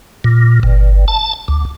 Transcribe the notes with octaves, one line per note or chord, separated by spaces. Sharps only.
A#2
G1
A5
D2